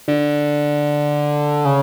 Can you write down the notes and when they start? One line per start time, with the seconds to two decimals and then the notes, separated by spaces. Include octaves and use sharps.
0.08 D3
1.65 C#3